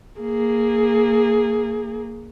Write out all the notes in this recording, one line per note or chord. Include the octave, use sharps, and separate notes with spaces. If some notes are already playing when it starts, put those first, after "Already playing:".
A#3 G#4